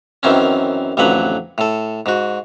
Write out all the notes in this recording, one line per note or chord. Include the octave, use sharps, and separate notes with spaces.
F#2 D#3 E3 C4 C#4
A1 F2 D3 F#3 B4 F#5
A2 A4
G#2 F#4